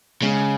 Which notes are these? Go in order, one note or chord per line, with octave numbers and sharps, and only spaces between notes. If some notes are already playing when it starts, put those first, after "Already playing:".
C#3 G#3